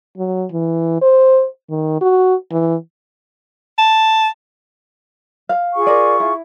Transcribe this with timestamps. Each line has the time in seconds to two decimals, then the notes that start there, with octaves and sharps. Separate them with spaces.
0.17 F#3
0.52 E3
1.02 C5
1.70 D#3
2.01 F#4
2.51 E3
3.78 A5
5.49 F5
5.75 F4 G#4 C#6
5.87 A#4 D5
6.20 E4